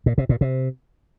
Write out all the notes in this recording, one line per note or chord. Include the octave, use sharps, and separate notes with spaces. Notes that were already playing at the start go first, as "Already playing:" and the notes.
A#2
C3
A#2
C3